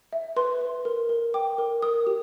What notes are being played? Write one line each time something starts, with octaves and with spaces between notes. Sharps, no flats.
E5
B4 C6
B4
A#4
A#4
G5 D6
A#4
A#4 D#6
G4